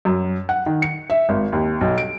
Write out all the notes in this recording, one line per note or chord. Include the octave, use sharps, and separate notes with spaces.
F#2
F#5
D#3
C#7
E5
G#1
D#2
B1
D7